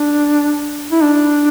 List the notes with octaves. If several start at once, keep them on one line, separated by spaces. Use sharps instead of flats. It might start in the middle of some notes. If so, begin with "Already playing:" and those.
Already playing: D4
E4
D4